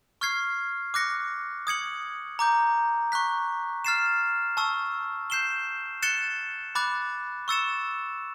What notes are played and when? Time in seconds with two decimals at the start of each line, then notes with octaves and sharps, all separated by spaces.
0.21 C#6 F6 G#6 C7
0.94 D6 F#6 A#6 C#7
1.67 D#6 G#6 C#7 F#7
2.39 A#5 D6 G6
3.12 C#6 F#6 B6
3.85 F6 A6 C7 E7
4.57 A5 C#6 E6
5.30 G6 C7 E7 G7
6.02 F#6 A6 C#7 E7 G7
6.75 B5 D6 F#6 A6
7.48 C#6 E6 A6 C#7 E7